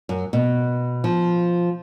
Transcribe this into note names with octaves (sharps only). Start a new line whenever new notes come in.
F#2
B2
F3